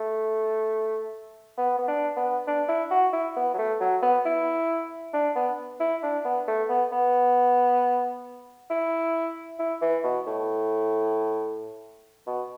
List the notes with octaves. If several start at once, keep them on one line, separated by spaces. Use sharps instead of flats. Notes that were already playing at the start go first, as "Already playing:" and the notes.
Already playing: A3
B3
B3
D4
B3
D4
E4
F#4
E4
B3
F#3
A3
F#3
B3
E4
D4
B3
E4
D4
B3
A3
B3
B3
E4
E4
E3
B2
A2
B2